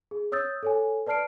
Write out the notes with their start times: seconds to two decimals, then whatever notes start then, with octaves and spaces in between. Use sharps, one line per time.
0.11 G#4
0.32 C#5 D#6 E6 G6 A6
0.63 A4 C#5 G#5
1.07 B4 D5 A5 F6 C7 D7